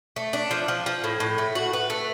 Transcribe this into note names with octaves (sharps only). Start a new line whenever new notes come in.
A3
D4
F3
F3
F3
A2
A2
A3
F#4
B4
A3